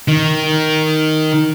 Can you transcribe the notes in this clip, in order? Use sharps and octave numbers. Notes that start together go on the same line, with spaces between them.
D#3